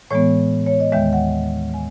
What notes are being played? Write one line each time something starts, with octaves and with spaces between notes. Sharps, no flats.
A2 E3 G#3 B3 C#5
C#5
D#5
D#2 D#3 G#3 E5
F#5
G#5